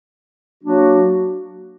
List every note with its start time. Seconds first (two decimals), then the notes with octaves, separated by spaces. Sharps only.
0.64 F#3 A#3 D4 F#4